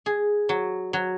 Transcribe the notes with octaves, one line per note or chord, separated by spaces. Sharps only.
G#4
F#3
F#3